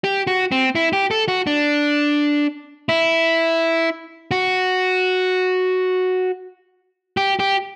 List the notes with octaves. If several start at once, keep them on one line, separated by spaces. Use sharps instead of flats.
G4
F#4
C4
E4
G4
A4
F#4
D4
E4
F#4
G4
G4